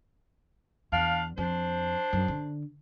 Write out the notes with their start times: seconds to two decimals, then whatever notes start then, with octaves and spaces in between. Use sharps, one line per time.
0.92 E2 D4 F5
1.38 F2 D4 C5
2.13 F#2
2.28 D3